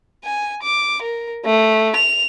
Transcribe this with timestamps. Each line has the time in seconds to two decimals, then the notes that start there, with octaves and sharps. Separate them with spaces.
0.24 G#5
0.63 D6
1.02 A#4
1.45 A3
1.96 F7